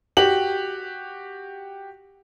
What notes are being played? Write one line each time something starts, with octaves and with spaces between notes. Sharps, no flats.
F#4 G4 F#7